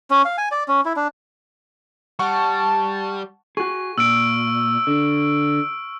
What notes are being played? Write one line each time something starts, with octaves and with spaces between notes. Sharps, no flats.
C#4
F5
G#5
D5
C#4
E4
D4
G3 F#5 A5 C#6
F#4 G#4 C#6
A#2 E6 F6 D7
D3